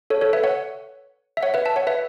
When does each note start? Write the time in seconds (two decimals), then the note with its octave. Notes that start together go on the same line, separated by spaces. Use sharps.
0.10 A4 C#5
0.21 A4 C#5
0.33 B4 E5
0.44 C#5 F#5
1.37 E5
1.43 C#5 F#5
1.54 B4 E5
1.65 E5 A5
1.76 C#5 F#5
1.87 B4 E5